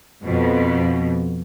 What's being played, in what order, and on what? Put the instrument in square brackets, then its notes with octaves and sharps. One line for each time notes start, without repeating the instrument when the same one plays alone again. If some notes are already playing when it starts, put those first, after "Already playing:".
[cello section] F2 B2